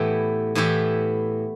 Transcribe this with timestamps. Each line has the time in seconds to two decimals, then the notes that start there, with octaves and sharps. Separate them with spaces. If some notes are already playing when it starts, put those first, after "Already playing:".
Already playing: A2 E3 B3 E4 G4
0.55 A2 E3 B3 E4 G4